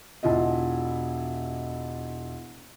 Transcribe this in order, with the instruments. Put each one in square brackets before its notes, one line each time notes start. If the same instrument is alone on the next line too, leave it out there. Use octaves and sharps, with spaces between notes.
[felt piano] E1 E4 F4 D#5